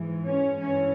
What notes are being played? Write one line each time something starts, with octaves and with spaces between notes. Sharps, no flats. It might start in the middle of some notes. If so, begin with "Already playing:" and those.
Already playing: G#2 E3
C#4
G2 E3 C#4